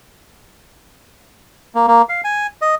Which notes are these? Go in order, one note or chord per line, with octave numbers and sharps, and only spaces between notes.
A#3
A#3
F5
G#5
D#5